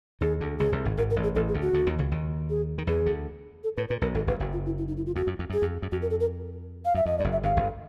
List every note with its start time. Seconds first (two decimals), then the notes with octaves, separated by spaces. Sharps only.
0.21 D#2 D#3 G#4
0.41 D2 D3
0.59 C#2 C#3 G#4
0.72 C2 C3
0.85 G#1 G#2
0.97 G#1 G#2 A#4
1.10 A#4
1.16 A1 A2
1.23 G#4
1.35 A1 A2 A4
1.48 G#4
1.54 D2 D3
1.61 F#4
1.73 D2 D3
1.87 D#2 D#3
1.99 C#2 C#3
2.12 D#2 D#3
2.50 G#4
2.78 D#3
2.87 E2 E3 G#4
3.06 D2 D3
3.63 A4
3.77 A2 B4
3.88 A#2 B4
4.02 B1 B2 A#4
4.14 G#1 G#2 A4
4.27 G1 G2 B4
4.40 F#1 F#2
4.53 F4
4.66 E4
4.78 E4
4.88 D#4
4.97 E4
5.06 F4
5.16 F2 F#4
5.27 F#2
5.39 F2
5.50 F#2 G#4
5.62 F2
5.82 F#2
5.92 F2 F#4
6.02 A#4
6.10 A4
6.20 A#4
6.85 F5
6.94 F#2 E5
7.06 F2 D#5
7.18 G2 D5
7.24 F#1 F#2
7.32 E5
7.43 G1 G2 F5
7.57 G1 G2